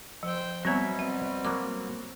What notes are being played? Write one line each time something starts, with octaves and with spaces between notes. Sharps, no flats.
F3 C5 G5
B2 F#3 G3 B3 C4 C#5 E5
C4 E5
F#3 A#3 D6